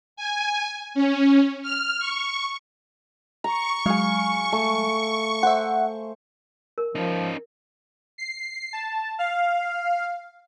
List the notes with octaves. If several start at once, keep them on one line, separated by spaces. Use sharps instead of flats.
G#5
C#4
F6
C#6
A#5 C#6
F#3 G#3 F5 G#5
A3
C5 E5 F#5
A#4
F3 C#4 D#4
C7
A5
F5